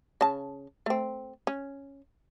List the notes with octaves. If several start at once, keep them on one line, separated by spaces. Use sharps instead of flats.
C#3 A5
A3 C4
C#4